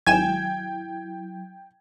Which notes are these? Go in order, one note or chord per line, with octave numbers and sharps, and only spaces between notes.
G#1 F#3 E4 G5 G#5 G#6 E7